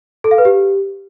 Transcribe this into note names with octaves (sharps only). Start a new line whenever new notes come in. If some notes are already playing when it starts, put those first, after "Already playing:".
A4
F5
B4
G4